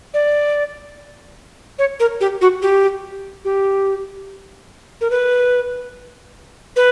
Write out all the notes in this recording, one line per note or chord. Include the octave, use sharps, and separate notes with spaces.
D5
C#5
A#4
G4
F#4
G4
G4
A#4
B4
B4